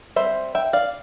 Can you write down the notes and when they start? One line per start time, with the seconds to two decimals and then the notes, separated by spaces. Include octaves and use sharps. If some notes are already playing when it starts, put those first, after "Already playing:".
0.16 G3 C4 C5 E5
0.55 E5 G5
0.73 D5 F5